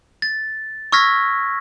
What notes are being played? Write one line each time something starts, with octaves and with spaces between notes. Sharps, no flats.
A6
C#6 E6 F6 G#6 A#6 B6